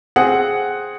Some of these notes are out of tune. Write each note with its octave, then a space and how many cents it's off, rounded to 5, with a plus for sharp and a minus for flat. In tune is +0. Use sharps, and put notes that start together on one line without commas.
C4 +5 G#4 +0 F#5 +0